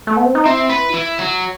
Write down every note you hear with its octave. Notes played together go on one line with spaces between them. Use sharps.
A3
B3
C4
D#4
C4 E4
B4
E4
F#3